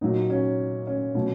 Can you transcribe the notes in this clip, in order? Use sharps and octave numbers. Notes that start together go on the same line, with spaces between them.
A#2 F#3 D#4
C#4
C#4
B2 F#3